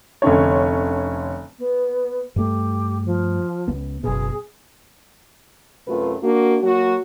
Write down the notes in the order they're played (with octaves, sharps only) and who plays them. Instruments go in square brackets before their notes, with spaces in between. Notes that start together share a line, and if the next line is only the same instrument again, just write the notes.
[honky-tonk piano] F1 D3 C#4 C#5
[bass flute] B3
[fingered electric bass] G2 A3 [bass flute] G4
[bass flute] F3
[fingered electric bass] C#2 B3
[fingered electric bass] F#1 B2 [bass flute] G#4
[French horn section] F#2 C3 A3 F4 B4
A#3 D4 F#4
F#3 A#3 F#4